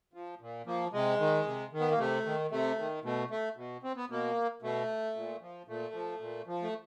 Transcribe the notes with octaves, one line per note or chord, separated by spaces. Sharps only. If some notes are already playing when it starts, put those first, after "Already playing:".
F3
A#2
F3 A#3
C3 G#3
D#3
C3
D#3
B3
A#3
C3 A3
D#3
C3 A3
D#3
B2 A3
A3
B2
C4
B3
B2 A#3
B2 A3
A#2
F3
A#2 A3
F3
A#2
F3
A3